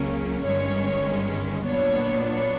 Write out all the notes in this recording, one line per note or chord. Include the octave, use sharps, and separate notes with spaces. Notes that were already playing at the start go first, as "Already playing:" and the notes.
Already playing: C#2 C#3 F#3 A#3 C#4
G1 G2 D#3 G#3 C#4 C#5
A#2 F#3 B3 D4 C#5
C#5